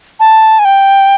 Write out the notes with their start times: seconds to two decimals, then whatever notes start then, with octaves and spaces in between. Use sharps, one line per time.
0.20 A5
0.59 G#5
0.65 G5